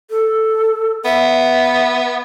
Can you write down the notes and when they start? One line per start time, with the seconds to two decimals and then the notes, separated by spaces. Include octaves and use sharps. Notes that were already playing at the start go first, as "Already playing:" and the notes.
0.10 A4
1.05 B3 E5